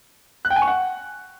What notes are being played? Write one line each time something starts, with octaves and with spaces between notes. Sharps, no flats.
F#6
G5
G#5
C#6
F#5